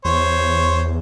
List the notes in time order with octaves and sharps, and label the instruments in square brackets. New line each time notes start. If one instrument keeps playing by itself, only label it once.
[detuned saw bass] E2 [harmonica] C5 C#5